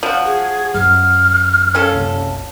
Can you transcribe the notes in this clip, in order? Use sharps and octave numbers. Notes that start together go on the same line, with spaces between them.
F3 F#4
G#4
F#2 F6
C#4 F4 A4
F#1 C2